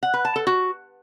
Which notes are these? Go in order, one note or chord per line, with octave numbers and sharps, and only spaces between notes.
F#5
B4
A5
A4
F#4